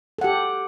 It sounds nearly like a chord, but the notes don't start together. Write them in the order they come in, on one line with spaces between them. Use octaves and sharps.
A4 F#5 G4